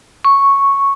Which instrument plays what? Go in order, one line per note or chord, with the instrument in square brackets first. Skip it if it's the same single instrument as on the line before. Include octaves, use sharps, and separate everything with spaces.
[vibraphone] C#6